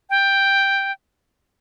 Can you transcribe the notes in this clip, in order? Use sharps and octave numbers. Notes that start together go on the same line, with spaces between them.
G5